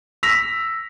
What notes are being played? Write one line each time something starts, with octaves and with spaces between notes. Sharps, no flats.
E6 A#6 B6 F7